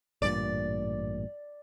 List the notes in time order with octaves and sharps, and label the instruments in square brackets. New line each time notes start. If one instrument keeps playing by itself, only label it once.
[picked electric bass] A1 G2 A#2 [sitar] D5